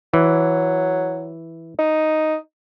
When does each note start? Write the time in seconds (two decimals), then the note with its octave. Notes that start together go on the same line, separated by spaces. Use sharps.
0.14 E3 F#3
1.79 D#4